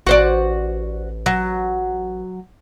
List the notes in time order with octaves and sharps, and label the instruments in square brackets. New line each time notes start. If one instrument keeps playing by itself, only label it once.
[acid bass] A1 [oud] F#4 C5 D5
[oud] F#3